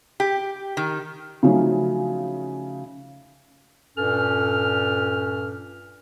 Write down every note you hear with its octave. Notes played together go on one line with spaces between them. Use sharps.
G4
D#3
C#3 F3 F#3 A3 C#4 D#4
G2 A#2 C#4 A4 F6